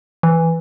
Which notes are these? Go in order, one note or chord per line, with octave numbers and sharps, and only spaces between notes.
E3